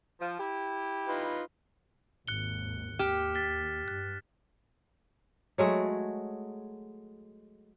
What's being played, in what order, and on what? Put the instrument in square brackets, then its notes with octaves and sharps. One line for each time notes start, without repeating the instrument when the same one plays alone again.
[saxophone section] F3
E4 G4
[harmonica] D#4 F4 B4
[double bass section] G#1 D#2 [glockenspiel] F#6 C#7 G7
[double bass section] D#2 [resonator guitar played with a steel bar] G4 [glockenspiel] F6 E7
[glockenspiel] A6 B6 G7
[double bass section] G2 [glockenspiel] F#6
[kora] F#3 G#3 A3